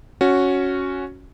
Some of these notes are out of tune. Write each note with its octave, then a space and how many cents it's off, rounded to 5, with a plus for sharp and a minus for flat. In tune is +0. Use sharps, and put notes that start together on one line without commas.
C#4 +0 F#4 -5